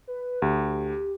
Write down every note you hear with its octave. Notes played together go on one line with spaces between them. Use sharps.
B4
D2 G4